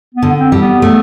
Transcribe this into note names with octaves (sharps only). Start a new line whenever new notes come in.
B3
D3
C4
G3
B3
A3